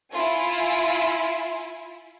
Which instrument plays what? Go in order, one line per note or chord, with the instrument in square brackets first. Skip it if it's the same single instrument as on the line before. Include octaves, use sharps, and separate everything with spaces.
[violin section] E4 F4 G#5